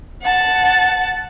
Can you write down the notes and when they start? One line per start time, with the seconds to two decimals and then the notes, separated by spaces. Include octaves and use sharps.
0.22 F#5 A5